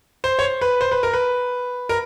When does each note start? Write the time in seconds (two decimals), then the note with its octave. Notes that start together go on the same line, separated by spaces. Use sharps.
0.24 C5
0.39 C#5
0.43 C5
0.61 B4
0.81 C5
0.92 B4
1.03 A#4
1.13 B4
1.89 A#4